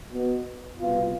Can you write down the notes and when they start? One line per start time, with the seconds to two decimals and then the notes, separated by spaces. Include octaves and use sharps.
0.10 B2 B3
0.80 C2 B2 B3 F4